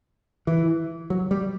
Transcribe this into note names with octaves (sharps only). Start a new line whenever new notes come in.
E3
F#3
G3